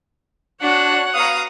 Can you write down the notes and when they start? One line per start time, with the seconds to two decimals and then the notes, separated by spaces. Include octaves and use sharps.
0.61 D4 F#4 C#5 F#5
1.15 B3 F#4 F5 A#5 D#6